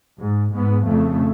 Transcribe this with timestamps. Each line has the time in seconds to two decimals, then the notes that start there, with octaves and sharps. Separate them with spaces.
0.22 G#2
0.54 G#2 B3
0.87 F2 C#3 A3